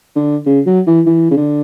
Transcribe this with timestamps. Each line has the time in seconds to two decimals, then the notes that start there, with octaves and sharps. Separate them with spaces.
0.16 D3
0.46 C#3
0.66 F#3
0.87 E3
1.06 E3
1.31 C#3
1.37 D3